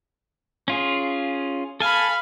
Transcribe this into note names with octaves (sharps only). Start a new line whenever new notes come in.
C#4 F4 G#4
A4 F5 G#5 B5